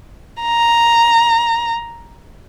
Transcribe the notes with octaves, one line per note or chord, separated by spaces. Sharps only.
A#5